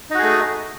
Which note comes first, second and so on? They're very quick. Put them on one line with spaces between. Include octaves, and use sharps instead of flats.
D#4 F#4 G#4 A3